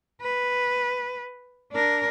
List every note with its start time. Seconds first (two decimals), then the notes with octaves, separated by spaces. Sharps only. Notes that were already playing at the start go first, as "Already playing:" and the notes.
0.21 B4
1.72 D4 A#4